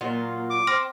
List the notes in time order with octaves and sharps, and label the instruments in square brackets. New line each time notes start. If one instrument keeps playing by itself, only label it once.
[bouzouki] A#2 F#3 F4 [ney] A#3
[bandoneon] D6
[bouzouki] C4 [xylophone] C6 F6 A#6